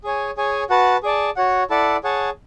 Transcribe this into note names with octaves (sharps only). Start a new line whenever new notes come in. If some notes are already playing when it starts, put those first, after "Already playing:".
G#4 C#5 G#5
G#4 C#5 G#5
F#4 B4 F#5 A5
G#4 D5 A5
F#4 C#5 F#5
E4 A4 D5 F#5 A5
G#4 C#5 F#5 A5